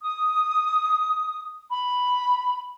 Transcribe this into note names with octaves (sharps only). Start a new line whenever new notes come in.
D#6
B5